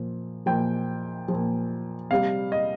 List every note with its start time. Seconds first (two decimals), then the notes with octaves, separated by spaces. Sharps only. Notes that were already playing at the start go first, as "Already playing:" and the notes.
Already playing: A#2 F3
0.46 A#2 F3 G5
1.28 A#2 F3
2.11 C3 G3 F5
2.52 D#5